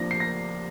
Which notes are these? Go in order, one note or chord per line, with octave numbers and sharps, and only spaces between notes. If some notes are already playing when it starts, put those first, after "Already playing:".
Already playing: F3 A#3 D4 A#6
C7
A#6